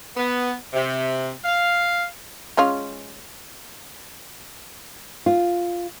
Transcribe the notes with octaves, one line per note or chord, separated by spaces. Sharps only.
B3
C3
F5
G#3 C#4 F4
F4